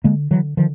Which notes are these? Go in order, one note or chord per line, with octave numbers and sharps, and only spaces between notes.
D3 G#3 A#3
D3 E3 F#3
D3 D#3 F3